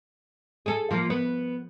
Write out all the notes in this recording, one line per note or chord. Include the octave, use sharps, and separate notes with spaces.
G#4 A4
F3 A#3
B3